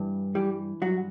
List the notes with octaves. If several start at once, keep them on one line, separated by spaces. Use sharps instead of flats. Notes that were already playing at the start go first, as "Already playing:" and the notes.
Already playing: G2 E3
E3 G3 G4
G2 F#3 F#4